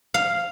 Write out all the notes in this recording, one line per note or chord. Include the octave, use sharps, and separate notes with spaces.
F5